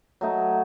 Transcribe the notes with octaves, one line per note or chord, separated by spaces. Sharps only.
F#3 A3 D#4